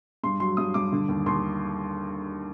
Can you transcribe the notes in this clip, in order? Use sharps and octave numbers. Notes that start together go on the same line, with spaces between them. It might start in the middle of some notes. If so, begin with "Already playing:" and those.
G2 C6
F#3 C6
G2 D#6
G2 D6
D3
D#2
D#2 C6